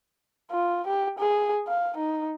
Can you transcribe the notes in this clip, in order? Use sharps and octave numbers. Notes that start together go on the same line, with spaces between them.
F4
G4
G#4
F5
D#4